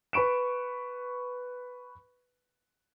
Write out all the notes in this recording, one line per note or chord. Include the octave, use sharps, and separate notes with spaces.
B4 B5 C#6 D7 E7